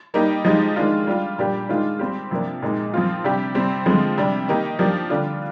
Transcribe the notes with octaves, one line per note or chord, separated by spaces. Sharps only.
G3 A#3 D#4 G4
F3 G#3 D#4 G4
D#3 G#3 D4 F4
G3 D4 F4
A#2 G3 D4 G4
D#3 G#3 D4 F4
G3 C4 G4
C3 F3 A#3 D4
A#2 G#3 D#4
F3 C4 F4
C3 G3 D4 G4
C3 G3 C4 G4
D3 F3 G#3 C4
C3 G3 D4
D#3 A#3 D#4 G4
F3 A#3 D4 G4
D3 G3 D4 F4